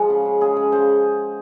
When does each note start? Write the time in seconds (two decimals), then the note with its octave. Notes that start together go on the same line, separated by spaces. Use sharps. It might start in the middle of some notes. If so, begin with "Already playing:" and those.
Already playing: F3 G#3 F#4
0.10 C#3
0.25 C#3
0.41 C#3 G#4
0.57 C#3
0.72 C#3 C5